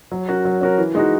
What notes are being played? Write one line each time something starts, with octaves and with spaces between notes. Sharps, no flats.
F#3
C#4 F#4 A#4
F#3
C#4 F#4 A#4
E3
G#3 D#4 F#4